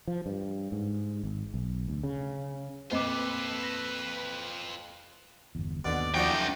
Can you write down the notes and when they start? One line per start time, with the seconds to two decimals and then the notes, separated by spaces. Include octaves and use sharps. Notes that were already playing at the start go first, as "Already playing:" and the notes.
0.07 F3
0.26 G2
0.72 G#2
1.23 G#1
1.54 B1
1.88 D2
2.03 C#3
2.91 F2 A#2 F4 A4 B4 C5 D#5 D6
3.63 A#6 E7
5.55 G1 E2
5.85 D#2 B2 D3 D5
6.15 F#2 F3 D#4 F#4 D5 G5